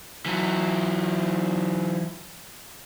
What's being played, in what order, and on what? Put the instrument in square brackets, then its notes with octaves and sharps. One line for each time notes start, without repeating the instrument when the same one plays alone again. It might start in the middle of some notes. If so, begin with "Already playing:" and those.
[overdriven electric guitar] E3 F#3